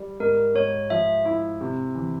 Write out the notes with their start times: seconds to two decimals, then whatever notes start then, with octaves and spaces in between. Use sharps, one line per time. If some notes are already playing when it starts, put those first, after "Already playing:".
Already playing: G3
0.20 G#2 A#4
0.55 G#2 C#5
0.90 F3 E5
1.25 E4
1.61 C3
1.95 E3